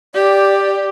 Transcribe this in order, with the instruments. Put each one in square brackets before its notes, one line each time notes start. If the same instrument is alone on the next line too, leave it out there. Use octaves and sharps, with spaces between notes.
[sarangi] G4 [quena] D5